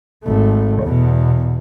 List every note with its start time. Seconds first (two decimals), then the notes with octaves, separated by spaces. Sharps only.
0.24 G#1 A3
0.82 E2 B2